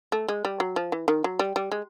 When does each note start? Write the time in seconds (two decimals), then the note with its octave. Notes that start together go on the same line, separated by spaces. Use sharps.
0.12 A3
0.28 G#3
0.45 G3
0.60 F#3
0.76 F3
0.92 E3
1.08 D#3
1.24 F#3
1.39 G3
1.56 G3
1.72 G#3